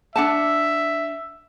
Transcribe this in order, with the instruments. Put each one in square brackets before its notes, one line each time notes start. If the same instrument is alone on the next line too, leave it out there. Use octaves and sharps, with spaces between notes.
[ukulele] D4 F#5 A5 [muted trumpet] E5